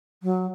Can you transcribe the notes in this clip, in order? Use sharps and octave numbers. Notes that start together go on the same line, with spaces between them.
F#3